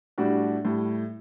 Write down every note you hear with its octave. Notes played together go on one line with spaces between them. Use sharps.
A2 G3 D4 F#4
A2 G3